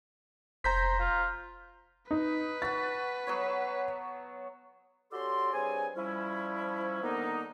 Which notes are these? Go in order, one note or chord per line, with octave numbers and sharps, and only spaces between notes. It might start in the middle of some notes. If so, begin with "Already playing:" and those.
F1 C5 A#5 G6 B6
F4
D#4 B4
F#4 A5 A6
F#3 B3 C#5
C#4 F#4 G4 A4 D5 C6
G2 C4 G#4 C#5 G#5
F3 G3 C#4 E4
D3 D#3 A#3 B3 D4 D#4